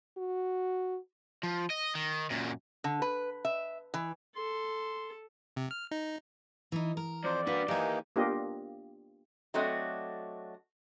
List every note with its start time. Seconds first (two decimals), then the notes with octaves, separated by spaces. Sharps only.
0.18 F#4
1.43 F3
1.70 D#5
1.95 D#3
2.31 F#2 A#2
2.84 D3
3.02 B4
3.45 E5
3.94 E3
4.36 A4 C6
5.56 C3
5.71 F6
5.91 D#4
6.72 E3 D#4
6.97 A#4
7.24 F2 C5 D5
7.47 A#3 D4 F#4 B4
7.68 D#2 E3 A#3 D#4 G4 G#5
8.16 A#3 B3 D4 F4 G4 D#5
9.54 F#3 A3 C4 D4 F#4 D#5